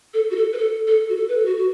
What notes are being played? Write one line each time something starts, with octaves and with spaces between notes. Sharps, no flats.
A4
F#4
A4
B4
A4
A4
F#4
A4
B4
A4
F#4
F#4